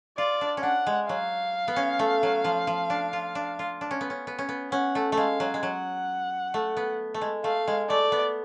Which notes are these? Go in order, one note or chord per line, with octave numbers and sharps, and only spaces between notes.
F4 D5
D4
C#4
D4 F#5
G#3
F#3 F5
B3
C#4
A3
F#3
F3
F3
D4
F4
D4
F4
D4
C#4
B3
C#4
B3
C#4
B3
C#4 F#5
A3
A3
G#3 F5
F#3
G#3
F#3 F#5
A3
B3
A3
G#3
A3 F5
G#3
A3 D5
B3